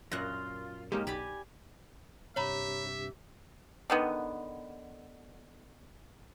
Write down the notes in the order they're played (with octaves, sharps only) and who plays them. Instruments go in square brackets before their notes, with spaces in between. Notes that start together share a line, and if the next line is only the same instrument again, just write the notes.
[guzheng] F#2 A#2 [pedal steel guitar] F4 [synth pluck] F#6 A#6
[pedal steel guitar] G#3 A#3 C#4 [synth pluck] D#4 G4
[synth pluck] B1 [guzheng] G4 D5 B5 [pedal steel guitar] G#5
[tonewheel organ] G2 C3 [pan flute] G4 [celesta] C#5 A#5 B5 [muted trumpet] E5
[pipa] D3 D#3 B3